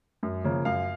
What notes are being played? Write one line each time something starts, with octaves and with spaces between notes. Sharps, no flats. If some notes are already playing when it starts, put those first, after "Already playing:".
F#2
C#3 F3 A#3 C#4
F#2 F5